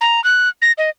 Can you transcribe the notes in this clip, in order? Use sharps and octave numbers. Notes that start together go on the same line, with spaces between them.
A#5
F#6
A#6
D#5